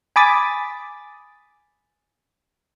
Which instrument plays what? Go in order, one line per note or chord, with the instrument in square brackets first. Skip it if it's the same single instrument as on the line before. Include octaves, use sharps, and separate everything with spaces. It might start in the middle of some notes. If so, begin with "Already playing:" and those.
[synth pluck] G#5 B5 D6 D#6 A6 B6